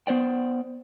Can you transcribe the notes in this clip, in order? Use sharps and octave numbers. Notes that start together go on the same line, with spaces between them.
B3 C5 D5 G5